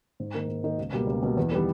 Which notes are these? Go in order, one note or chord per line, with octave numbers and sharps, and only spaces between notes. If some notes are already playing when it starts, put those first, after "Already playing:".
G#2
D#3 A#3 D#4 A#4
G#2
D#3 A#3 D#4 A#4
C#2
B2 G3 A#3
C#2
B2 G3 A#3
E2
D#3 G3 B3